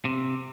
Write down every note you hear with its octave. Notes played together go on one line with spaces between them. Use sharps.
C3